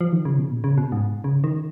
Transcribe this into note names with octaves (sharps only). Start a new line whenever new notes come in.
F3
D#3
C#3
B2
A#2
C#3
B2
G#2
C#3
D#3